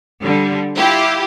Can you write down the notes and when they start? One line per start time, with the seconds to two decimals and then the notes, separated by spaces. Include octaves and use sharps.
0.23 D3 G3
0.77 E4 F4 G4